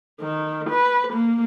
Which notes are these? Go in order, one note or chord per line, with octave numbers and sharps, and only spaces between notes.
D#3
B4
A#3